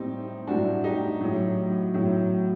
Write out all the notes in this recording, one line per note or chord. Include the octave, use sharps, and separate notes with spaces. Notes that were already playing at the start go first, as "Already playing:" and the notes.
Already playing: A2 G3 C4 D#4
A2 G3 D4 F#4
D#4 G4
A2 F#3
A2 F#3